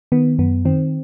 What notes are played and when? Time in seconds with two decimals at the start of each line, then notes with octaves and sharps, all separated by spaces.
0.12 D#3 B3
0.39 F#2 B3
0.65 D#3 C4